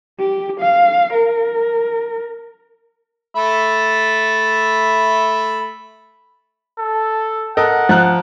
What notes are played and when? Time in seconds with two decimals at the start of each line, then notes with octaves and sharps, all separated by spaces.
0.20 G4
0.60 F5
1.14 A#4
3.35 A3 E5 B5
6.79 A4
7.57 A4 A#4 D#5 F#5
7.89 F3 A#5 F#6